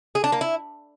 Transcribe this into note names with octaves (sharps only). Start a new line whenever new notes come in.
G#4
D4
A#3
E4